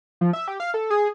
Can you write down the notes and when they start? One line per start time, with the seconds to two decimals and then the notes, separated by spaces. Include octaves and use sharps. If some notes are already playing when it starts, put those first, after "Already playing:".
0.21 F3
0.33 E5
0.48 G4
0.60 F5
0.74 A4
0.90 G#4